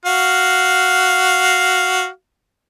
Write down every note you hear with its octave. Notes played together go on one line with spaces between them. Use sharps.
F#4 F5